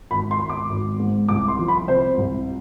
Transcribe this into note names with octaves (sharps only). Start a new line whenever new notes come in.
G#1 B5
C6
G#1
D6
G#1
G#2
C2 D6
C6
F3
B5
C3 C5
C2